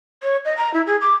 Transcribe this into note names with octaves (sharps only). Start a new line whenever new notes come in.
C#5
D#5
A#5
E4
G#4
D6